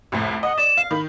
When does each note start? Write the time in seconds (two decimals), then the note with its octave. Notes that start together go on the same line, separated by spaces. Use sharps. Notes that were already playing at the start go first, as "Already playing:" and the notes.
0.12 C2 F2 A2
0.43 D#5 F#5
0.58 D5 E7
0.77 F5
0.91 D#3 B5